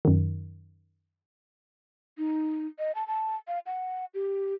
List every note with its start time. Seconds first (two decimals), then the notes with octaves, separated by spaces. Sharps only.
0.05 F#2 D#3
2.18 D#4
2.79 D#5
2.95 A5
3.08 A5
3.48 F5
3.66 F#5
4.14 G4